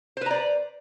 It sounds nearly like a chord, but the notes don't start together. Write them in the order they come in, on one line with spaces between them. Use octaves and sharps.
C5 B4 A#5 D5